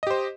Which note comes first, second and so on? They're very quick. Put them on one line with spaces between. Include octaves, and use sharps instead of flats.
D#5 G4 C5